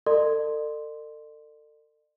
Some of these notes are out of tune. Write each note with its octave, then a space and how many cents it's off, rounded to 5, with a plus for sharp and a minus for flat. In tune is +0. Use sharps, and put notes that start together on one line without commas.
A4 +40 D5 +40 C6 +0